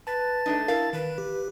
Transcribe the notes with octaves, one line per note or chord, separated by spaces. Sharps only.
B4 A5 A6
A3 D4 D#4
E4 A#4 F5
D#3 B4
G4